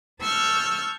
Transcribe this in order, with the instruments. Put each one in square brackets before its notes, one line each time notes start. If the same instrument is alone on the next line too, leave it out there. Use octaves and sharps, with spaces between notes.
[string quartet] A5 C#6 E6 F6 G6